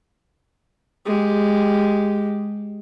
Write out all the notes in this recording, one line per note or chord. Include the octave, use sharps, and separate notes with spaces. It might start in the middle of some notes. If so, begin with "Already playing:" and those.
G#3 G4